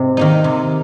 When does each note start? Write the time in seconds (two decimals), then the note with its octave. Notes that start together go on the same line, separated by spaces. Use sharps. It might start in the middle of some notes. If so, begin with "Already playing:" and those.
Already playing: G#2 C3 C4 D#5
0.17 D#3 A#3 D#4
0.44 C3